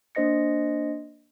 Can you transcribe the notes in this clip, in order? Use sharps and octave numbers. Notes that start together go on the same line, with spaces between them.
A#3 D4 C5 D#5 A#6 C#7